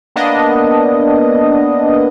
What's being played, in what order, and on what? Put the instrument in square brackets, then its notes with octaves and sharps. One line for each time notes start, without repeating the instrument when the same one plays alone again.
[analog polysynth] A#3 B3 D4 D#5